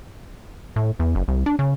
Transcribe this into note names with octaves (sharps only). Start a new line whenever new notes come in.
A2
E2
F#1
C2
D4
C#3